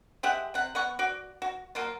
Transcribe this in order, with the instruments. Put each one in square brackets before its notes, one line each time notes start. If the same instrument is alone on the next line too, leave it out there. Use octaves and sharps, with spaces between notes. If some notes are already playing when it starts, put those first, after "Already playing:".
[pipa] G#3 G4 E5 F#5
C3 F#5
B3 F#5 C#6
F#4 D5
F#4
F#3 A#3 F4